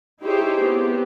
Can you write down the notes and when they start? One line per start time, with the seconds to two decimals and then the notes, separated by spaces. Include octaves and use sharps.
0.22 D#4 E4 G4 G#4 C5 C#5
0.62 B3 C4 G4